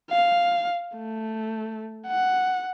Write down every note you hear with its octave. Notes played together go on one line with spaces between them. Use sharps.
F5
A3
F#5